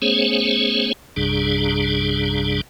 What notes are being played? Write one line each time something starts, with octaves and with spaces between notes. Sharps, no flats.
A3 B3 C#4 G#4 C5 C#5
A#1 F#2 C3 G3 D4 G#4